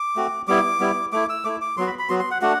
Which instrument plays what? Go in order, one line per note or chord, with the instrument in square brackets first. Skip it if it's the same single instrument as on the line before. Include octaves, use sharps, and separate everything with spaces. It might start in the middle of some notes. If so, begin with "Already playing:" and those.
Already playing: [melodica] D6
A3 C4 F#4
G3 B3 E4 D6
G3 B3 E4
A3 E4 D6
E6
A3 E4 D6
D6
F#3 B3 F#4 C6
B5
B5
F#3 B3 F#4 C6
C6
F#5
A3 D4 F#4 F#5